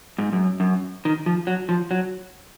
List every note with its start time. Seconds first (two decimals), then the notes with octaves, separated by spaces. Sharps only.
0.18 G#2
0.32 F#2
0.60 F#2
1.05 D#3
1.26 F3
1.47 F#3
1.69 F3
1.91 F#3